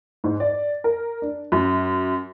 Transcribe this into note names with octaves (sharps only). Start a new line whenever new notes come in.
G#2
D5
A#4
D4
F#2